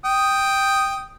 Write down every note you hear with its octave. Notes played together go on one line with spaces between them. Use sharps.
G5 D#6